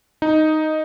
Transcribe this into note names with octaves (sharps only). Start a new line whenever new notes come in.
D#4